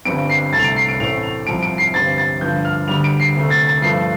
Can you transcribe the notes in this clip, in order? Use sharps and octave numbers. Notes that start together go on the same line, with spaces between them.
G1 G2 G3 C4 D7
C7
C2 C3 A3 A6
F7
D7
C7
D7
A1 A2 A3 C4 F7
F7
C2 C3 F3 D7
D7
C7
G1 G2 G3 C4 A6
A6
G2 D3 F3 G6
F6
D2 D3 G3 F7
D7
C7
D2 C3 A3
A6
A6
G2 F3 A3 C7